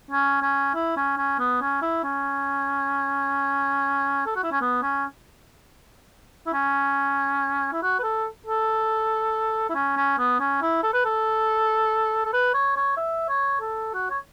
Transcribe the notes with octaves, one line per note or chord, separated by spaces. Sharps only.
C#4
C#4
E4
C#4
C#4
B3
C#4
E4
C#4
A4
F#4
E4
C#4
B3
C#4
E4
C#4
E4
F#4
B4
A4
A4
E4
C#4
C#4
B3
C#4
E4
A4
B4
A4
A4
B4
C#5
C#5
E5
C#5
A4
F#4
C#5